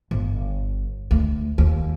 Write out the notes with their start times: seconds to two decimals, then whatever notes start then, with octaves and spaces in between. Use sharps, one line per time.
0.11 G1
1.11 D2
1.58 D#2